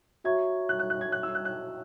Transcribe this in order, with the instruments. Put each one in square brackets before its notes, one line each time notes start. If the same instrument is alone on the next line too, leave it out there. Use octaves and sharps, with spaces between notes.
[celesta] F#4 C#5 E5 A#5 C#6 [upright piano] G#6
[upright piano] F#6
F#6
F#6
G#6
F#6
E6
F#6
F#6